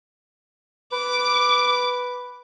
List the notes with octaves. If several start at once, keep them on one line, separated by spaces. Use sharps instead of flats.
B4 D6